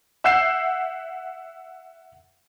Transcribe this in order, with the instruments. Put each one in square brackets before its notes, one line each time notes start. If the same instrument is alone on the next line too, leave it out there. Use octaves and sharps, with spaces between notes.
[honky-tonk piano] E5 F#5 E6 G6 C7 E7